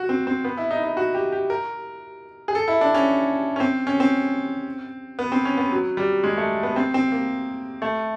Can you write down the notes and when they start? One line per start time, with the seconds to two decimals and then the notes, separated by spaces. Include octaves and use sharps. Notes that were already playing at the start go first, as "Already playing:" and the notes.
Already playing: F#4
0.09 C4
0.27 C4
0.44 B3
0.57 E4
0.71 D#4
0.84 D#4
0.97 F#4
1.14 G4
1.32 G4
1.50 A#4
2.48 G#4
2.55 A4
2.68 E4
2.81 D4
2.95 C#4
3.56 C#4
3.60 C4
3.87 C#4
4.00 C4
5.19 B3
5.32 C4
5.45 C#4
5.58 B3
5.72 F#3
5.97 G3
6.24 G#3
6.37 A3
6.63 B3
6.76 C4
6.94 C4
7.12 A#3
7.82 A3